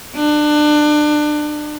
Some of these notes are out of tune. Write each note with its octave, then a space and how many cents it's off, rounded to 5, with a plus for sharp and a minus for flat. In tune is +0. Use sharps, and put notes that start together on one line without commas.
D4 +25